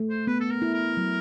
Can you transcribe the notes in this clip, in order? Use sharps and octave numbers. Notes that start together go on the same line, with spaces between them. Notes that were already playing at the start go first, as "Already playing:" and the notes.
Already playing: A3
C5
B3 B4
A4
A#4
E4
A#4
F#3